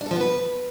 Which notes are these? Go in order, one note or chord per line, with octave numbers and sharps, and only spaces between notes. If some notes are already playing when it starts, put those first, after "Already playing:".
D4
A4
F3
B3
B4